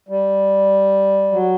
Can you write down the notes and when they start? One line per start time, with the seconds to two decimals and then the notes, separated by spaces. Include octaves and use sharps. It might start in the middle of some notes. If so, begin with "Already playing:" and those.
0.09 G3
1.32 F#3